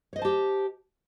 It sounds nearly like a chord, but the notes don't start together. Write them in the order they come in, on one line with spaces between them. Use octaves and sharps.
C#5 D#5 C5 A5 G4